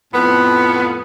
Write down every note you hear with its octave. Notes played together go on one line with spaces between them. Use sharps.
F2 A2 B3